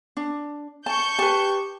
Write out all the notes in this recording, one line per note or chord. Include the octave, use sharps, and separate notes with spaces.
D4
A5 C#6 G6
G4 B4 A5